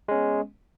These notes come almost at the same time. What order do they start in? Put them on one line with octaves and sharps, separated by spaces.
G#3 C#4 B3